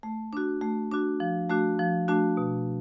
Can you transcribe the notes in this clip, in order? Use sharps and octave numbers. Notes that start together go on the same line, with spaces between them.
A3
D4 F#4
A3
D4 F#4
F3
A3 D4 F#4
F3
A3 D4 F#4
B2